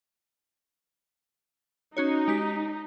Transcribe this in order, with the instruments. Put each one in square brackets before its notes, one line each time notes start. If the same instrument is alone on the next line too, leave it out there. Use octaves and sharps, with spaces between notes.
[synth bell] C#4 F#4 C#5 [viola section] D#4
[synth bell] G#3 G4 B6